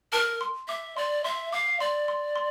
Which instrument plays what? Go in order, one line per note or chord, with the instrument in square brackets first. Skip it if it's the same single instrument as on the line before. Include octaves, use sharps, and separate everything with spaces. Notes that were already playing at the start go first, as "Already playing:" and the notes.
[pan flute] A#4 [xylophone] A5
[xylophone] C6
[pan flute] E5 [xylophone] D6
[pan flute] D5 [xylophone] C6
[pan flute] E5 [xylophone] C6
[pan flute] F5 [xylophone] D6
[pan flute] D5 [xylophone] C6
[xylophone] C6
C6